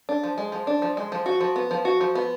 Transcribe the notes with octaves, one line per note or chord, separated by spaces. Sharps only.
D4
F3
G#3
F3
D4
F3
G#3
F3
F#4
F3
B3
F3
F#4
F3
B3